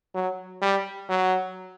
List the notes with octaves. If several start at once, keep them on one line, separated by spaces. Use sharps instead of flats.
F#3
G3
F#3